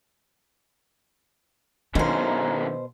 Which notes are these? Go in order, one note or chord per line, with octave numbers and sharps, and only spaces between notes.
F#2 B2 D3 D#3 C5 F5 G#5 A#5